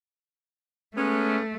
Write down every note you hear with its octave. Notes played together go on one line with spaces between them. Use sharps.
G#3 A3 B3 C#4